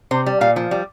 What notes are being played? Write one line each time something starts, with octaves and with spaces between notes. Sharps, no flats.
C3 C5
G3
A#2 F5
F3
G3